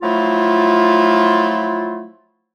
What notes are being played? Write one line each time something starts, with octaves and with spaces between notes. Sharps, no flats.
F3 F#3 A3 E4 F4